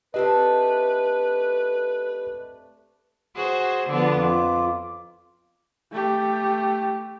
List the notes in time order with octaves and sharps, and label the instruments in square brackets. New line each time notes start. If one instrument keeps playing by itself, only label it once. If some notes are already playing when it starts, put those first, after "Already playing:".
[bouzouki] A3 C4 D4 [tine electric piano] G4 D#5 [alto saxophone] B4
[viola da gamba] F#4 G#4 C5
D3 F3 B3
[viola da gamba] F2 [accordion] F4 D6
[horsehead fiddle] A3 G4